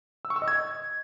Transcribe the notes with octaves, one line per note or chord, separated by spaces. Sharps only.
E6
C#6
E6
D#5
G#6